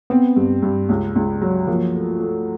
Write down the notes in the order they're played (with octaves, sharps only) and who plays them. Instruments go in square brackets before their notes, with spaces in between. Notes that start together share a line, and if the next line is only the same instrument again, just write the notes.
[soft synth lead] B3 [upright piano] C4
[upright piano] G2
G2
C#2
C#2
F#3
[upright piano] F3 [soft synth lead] A#3
[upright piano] A3
A3